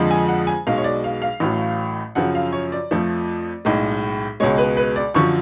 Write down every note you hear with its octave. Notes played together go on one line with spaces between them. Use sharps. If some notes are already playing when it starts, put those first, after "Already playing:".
Already playing: F2 D3 F3 G#3
G#5
F#5
G#5
B1 B2 G#3 F5
C#5
D5
F5
F5
A1 A2 F#3 A3
F#2 C#3 F3 F#5
F5
C#5
D5
F2 F3 A3
B1 A2 G#3
C#2 B2 G#3 C#5
B4
B4
D5
F#2 D3 F3 C#6